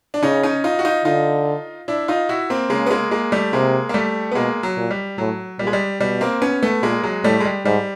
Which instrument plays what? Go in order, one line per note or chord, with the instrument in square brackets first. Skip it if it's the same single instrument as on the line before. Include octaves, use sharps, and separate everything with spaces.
[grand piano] D4
[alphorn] C#3 [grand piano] C#4 D#4
[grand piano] C#4 D#4
D#4 F4
F#4
D#4 F4
[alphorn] D3 [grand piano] D#4 F4
[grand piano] D4 E4
D#4 F4
E4 F#4
A#3 C4
[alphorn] C#3 [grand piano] G#3 A#3
[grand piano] B3
G#3 A#3
G#3 A#3
G3 A3
[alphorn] C3 [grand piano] G#3 A#3
[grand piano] A#3
G3 A3
B3
[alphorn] B2 [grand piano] G#3 A#3
[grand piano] F#3
[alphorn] A#2
[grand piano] G3
[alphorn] A2 [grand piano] F#3
[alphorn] A#2 [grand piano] G3
[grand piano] G#3
G3
[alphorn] B2 [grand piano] G3
[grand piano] A#3 C4
B3 C#4
A3 B3
[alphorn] A#2 [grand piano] G#3 A#3
[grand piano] F#3 G#3
[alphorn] A2 [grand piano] G3 A3
[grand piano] G#3
G3
[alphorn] G#2 [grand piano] G3